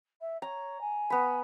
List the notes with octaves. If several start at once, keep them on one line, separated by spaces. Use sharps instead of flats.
E5
C#5 A#5
G#5
B3 B5